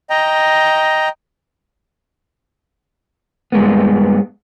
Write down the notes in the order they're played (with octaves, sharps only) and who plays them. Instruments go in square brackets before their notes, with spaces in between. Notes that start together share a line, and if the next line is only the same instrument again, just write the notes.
[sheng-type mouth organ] D#5 G5 A#5
[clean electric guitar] G2 G#3 A#3 B3